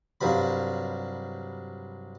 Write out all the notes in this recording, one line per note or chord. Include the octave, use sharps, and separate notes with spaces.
C2 G2 F3 F#3 B5